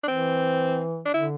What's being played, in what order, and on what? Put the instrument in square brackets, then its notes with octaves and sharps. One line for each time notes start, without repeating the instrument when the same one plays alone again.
[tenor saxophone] D4
[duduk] E3 [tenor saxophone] C4
[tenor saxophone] D4
[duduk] D3 [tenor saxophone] E4